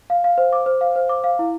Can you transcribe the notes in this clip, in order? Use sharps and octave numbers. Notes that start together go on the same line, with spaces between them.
F5
F5
C5
D6
C5
F5
C5
D6
F5
E4